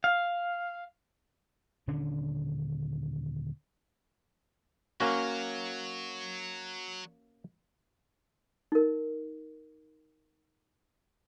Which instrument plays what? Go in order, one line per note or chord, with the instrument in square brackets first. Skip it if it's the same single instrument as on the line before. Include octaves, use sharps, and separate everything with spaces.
[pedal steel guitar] F5
[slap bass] D#1 D3 C#4 D4
[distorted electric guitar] F#3 [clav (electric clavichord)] A#3 C#4 F#4
[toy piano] D#4 A#4